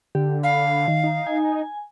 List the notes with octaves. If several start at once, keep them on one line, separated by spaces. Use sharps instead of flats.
D3 G4
F5 B5
D#3
D#4
G#5